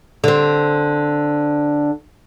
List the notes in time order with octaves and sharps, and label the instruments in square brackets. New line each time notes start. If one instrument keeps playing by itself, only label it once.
[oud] D3 C4